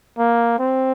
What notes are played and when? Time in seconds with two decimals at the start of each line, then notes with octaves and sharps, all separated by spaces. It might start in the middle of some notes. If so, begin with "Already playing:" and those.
0.18 A#3
0.59 C4